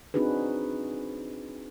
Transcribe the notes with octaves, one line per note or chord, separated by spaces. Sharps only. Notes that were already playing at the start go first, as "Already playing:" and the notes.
C4 D4 D#4 F#4 G#4 B4